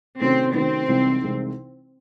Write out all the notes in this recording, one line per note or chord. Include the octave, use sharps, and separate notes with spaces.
C3 D#3 A3 C4 C#4 F#4
C3 D#3 A3 C4 C#4 F#4
C2 C3 E3 G#3 D#4
C2 C3 E3 G#3 D#4